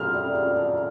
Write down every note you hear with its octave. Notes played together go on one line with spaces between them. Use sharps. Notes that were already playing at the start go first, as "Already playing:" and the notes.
Already playing: A3 E4 C5 F6
G3
F4
D4